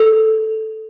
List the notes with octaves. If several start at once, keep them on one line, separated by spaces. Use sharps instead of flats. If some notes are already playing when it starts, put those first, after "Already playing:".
Already playing: A4